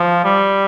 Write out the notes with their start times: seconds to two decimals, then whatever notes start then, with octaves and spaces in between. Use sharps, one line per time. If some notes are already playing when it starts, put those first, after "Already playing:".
Already playing: F3
0.24 G3